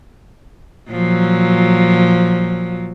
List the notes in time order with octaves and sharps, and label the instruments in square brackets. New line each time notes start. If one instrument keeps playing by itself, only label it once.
[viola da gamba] A#2 F3 F#3